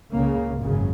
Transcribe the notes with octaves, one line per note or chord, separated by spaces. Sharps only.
C#2 C#3 A#3
G#1 F#2 C#3